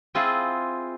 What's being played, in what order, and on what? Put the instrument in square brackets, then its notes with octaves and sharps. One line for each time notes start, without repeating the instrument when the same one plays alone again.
[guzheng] C4 E4 F4 G#4 F#5 A5